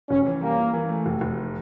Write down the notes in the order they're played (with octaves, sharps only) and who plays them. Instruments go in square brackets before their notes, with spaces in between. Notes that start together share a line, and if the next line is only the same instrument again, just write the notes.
[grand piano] F1 [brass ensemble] C#4
[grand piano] E3
[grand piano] G3 [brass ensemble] A#3
[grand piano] E3
E3
A3
F1
F1